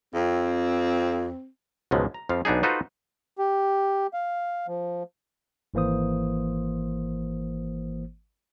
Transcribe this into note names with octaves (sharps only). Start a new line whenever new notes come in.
F2 C4
C#2 G#2 B2 F3 F#3 G#3
A#5
F2 F3 F5
B1 B3 D4 D#4 G#4
D#4 F4 F#4 A4 B4 C5
G4
F5
F3
G#1 E3 A#3 C5 D#6